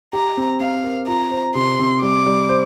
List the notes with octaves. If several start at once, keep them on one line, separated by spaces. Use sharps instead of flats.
G4 A#5
C4
C4 F5
A#4
F4 A#5
C5
C3 C6
C3
G3 D6
G3
C5